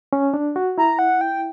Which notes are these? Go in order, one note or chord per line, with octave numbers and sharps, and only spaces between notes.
C#4
D4
F#4
E4 A#5
F#5
G5